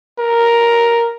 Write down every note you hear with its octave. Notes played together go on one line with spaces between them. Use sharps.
A#4